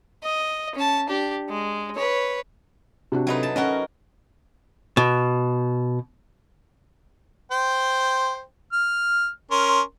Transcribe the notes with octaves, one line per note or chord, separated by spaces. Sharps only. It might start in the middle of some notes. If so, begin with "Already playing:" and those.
D#5
C#4 A5
D4 G4
G#3
B4 C#5
C3 D4 F#4
F#3 D#4 B4
A5
C#4 F#4 A#4 D#5
B2
C5 G5
F6
C#4 A#4 C6